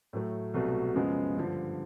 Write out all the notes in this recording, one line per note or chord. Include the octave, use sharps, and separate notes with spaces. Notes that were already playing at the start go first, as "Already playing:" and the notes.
A2 F#3 A3
C2 B2 F#3 A3
F#2 C#3 F3 G#3 B3
G2 D3 F3